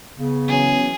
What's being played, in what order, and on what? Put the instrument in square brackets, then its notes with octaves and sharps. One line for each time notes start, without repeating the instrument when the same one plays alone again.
[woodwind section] C#3 [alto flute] B3
[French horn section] E3 F#3 C#4 [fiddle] G#4